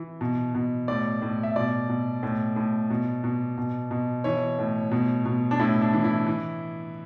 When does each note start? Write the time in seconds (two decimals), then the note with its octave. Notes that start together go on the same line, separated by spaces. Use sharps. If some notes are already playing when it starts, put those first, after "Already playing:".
Already playing: E3
0.21 B2
0.55 B2
0.88 A2 D5
1.22 A2
1.43 E5
1.56 B2 D5
1.89 B2
2.23 A2
2.56 A2
2.90 B2
3.24 B2
3.58 B2
3.91 B2
4.24 E3 C#5
4.59 A2
4.91 B2
5.25 B2
5.51 D4
5.59 A2 E4
5.81 D4
5.93 E3
6.04 E4
6.27 E3